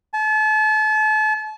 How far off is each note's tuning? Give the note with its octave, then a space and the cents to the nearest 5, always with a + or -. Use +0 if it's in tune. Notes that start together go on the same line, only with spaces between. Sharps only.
A5 -35